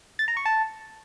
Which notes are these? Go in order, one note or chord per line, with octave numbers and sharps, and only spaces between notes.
A6
A#5
C#6
A5